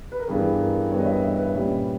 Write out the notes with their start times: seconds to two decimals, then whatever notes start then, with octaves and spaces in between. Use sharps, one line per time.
0.12 B4
0.20 A#4
0.28 G2 E3 G3 B3 G#4
0.59 A#4
0.91 G2 E3 G3 B3 C#5
0.99 D#5
1.06 E5
1.22 D#5
1.37 B4
1.54 A#2 G3 C#4